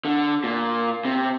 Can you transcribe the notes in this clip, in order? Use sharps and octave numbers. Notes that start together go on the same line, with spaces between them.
D3
A#2
C3